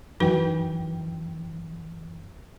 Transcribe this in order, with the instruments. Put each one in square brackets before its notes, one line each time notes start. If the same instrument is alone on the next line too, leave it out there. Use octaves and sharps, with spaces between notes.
[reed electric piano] F#2 E3 G5 [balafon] D#4 F#4 B4